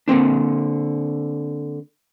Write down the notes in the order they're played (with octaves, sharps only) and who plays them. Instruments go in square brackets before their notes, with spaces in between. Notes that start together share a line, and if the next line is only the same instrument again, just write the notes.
[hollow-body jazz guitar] D3 A#3 C4 D4